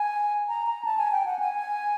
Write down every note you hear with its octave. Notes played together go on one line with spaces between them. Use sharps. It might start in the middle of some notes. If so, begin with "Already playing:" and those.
Already playing: G#5
A#5
A#5
A5
G#5
G5
F#5
G#5